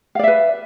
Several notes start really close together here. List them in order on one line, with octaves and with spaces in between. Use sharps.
F5 D5 E5 B4